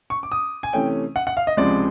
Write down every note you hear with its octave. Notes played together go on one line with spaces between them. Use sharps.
C#6
D6
D#6
G#5
C3 E3 A3 C#4 G5
F#5
F#5
F5
D#5
C#2 C3 F3 G#3 D5